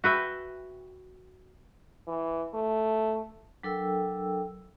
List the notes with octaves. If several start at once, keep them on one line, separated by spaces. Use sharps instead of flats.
F#4 B4 E5 G5
E3
A3
F#3 D4 A4 A#4 G5 E6